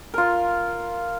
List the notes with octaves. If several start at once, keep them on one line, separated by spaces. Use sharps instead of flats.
F4 A#4